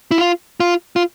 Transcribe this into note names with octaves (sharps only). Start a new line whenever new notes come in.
E4
F4
F4
F4